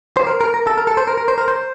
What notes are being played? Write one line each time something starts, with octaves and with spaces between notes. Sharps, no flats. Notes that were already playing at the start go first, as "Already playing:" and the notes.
C5
A#4
A#4
A#4
A4
A#4
A4
C5
A#4
A#4
C5
A#4
C5